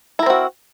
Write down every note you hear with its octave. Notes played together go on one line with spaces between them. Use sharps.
C4 E4 F#4 A#4